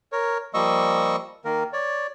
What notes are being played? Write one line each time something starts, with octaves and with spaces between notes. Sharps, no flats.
A#4 C#5
F3 G3 A#3 D#5 C#6 E6
D#3 A#3 A#4
C#5 D5